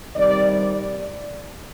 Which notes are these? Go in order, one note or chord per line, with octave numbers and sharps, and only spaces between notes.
C3 D#3 G3 D5
D5